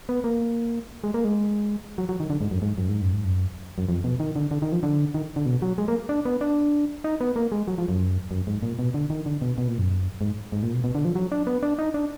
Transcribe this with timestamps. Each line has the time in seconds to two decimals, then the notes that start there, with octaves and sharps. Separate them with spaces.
0.09 B3
0.24 A#3
1.04 G#3
1.14 A#3
1.25 G#3
1.98 F#3
2.09 F#3
2.20 D#3
2.30 D3
2.41 G#2
2.51 F#2
2.62 G#2
2.78 F#2
2.89 G#2
3.02 F#2
3.13 G#2
3.25 F#2
3.78 F#2
3.89 F2
4.04 B2
4.20 D#3
4.36 D3
4.51 D3
4.62 D#3
4.72 F3
4.83 D3
5.14 D#3
5.36 D3
5.46 B2
5.62 F#3
5.78 G#3
5.88 A#3
6.09 D4
6.25 B3
6.41 D4
7.04 D#4
7.21 B3
7.36 A#3
7.52 G#3
7.68 F#3
7.78 F3
7.88 F#2
8.31 F#2
8.47 G#2
8.63 A#2
8.79 B2
8.94 D3
9.10 D#3
9.26 D3
9.41 B2
9.58 B2
9.68 A#2
9.78 F#2
10.21 G#2
10.52 G#2
10.63 A#2
10.73 B2
10.84 B2
10.95 D3
11.05 F3
11.15 F#3
11.32 D4
11.47 B3
11.63 D4
11.79 D#4
11.94 D4